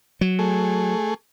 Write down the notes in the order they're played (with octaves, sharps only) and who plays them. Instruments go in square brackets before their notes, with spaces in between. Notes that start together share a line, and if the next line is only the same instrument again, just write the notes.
[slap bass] F#3
[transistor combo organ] A3 G#4